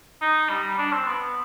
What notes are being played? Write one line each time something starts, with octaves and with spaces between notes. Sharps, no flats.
D#4
G3
D4
C4
B3